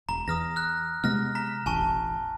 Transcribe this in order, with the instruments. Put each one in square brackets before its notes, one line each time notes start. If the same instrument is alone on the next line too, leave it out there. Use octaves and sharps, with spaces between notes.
[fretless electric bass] E1 [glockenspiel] A#5
[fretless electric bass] E2 [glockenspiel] D#6 F6 A#6
[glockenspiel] F6 F#6
[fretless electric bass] C3 G#3 B3 [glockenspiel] F6 A#6
[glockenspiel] A#5 B6
[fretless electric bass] E1 A1 [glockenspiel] G#5 A5 C#6